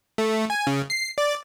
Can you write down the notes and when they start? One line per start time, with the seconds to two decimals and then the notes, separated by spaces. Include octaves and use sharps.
0.18 A3
0.50 G#5
0.67 C#3
0.90 C7
1.18 D5